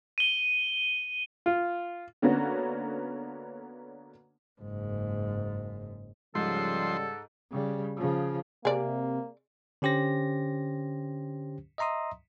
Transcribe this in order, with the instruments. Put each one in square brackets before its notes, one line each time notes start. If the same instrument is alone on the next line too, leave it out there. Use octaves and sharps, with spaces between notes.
[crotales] D#7 G7
[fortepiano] F4
[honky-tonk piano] D3 A#3 B3 C#4 F#4
[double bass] F#1 G#2
[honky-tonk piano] G#2 [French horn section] C#3 G3 [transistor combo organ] F3 C6 [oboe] A4
[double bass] C#3 G3
C#3 F3
[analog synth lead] C3 [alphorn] A#3 [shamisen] G#4 D5
[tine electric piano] D3 C#4 G4 C5 A#6
D#5 E5 A#5 C6 D#6